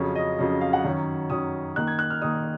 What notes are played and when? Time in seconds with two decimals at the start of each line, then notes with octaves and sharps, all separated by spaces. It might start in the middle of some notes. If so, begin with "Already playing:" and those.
Already playing: F2 C#3 F#3 C#4
0.15 D#5
0.38 F2 C#3 F#3 C#4
0.61 F5
0.73 F#5
0.84 F#2 D#3 F#3 C#4
1.30 F#2 D#3 F#3 C#4 D#6
1.76 D#3 A#3 D#4 F#6
1.87 G#6
1.99 F#6
2.10 F6
2.22 D#3 A#3 D#4 D#6